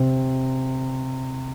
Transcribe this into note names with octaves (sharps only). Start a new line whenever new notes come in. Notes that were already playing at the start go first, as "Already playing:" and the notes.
Already playing: C3